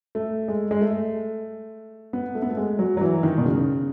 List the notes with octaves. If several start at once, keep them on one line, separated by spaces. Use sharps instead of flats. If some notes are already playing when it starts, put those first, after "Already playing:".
A3
G#3
G#3
A3
B3
A3
B3
A3
G#3
F#3
F#3
E3
D#3
B2
C#3